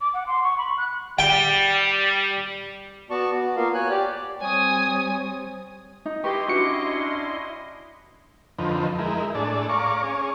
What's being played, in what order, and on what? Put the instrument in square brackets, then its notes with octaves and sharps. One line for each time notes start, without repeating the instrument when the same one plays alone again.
[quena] D6
F#5
C6
C#6
B5
F#6
[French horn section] G3 [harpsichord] G5
[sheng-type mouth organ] B3 F#4 D5 A5 C#6
F#4
A#3 B3 F4 A#4 F5
C#5 G#5 F#6
G4 D5
[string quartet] G3 C4 [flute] C#5 [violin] G#5 D#6
[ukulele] D#4
[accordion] E4 D#5 C6 [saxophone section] G4 [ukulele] B4 [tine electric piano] C#6
[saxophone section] C#4 D4 [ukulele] F#4 [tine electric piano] C#6 D6 C#7
[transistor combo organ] F2 D3 F3 D#4 B4 C5
G#3 D#4 E4 A#4
A2 D4 G#4 A4 D5
C#5 D5 F5 A#5 C#6 D6
C#4 G#4 C#5